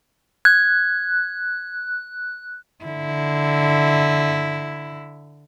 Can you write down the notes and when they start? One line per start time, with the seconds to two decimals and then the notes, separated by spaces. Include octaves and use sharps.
0.45 F#6 G#6
2.84 D3 E4